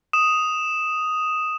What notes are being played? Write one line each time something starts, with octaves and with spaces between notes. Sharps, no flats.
D#6 E7